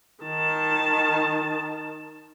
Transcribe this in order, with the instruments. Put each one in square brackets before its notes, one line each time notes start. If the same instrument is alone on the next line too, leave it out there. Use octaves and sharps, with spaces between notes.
[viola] D#3 A5